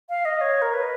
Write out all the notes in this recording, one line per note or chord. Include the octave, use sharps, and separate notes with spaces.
F5
D#5
C#5
A#4
B4